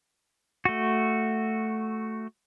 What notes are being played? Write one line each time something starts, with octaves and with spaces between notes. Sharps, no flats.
A3 F#4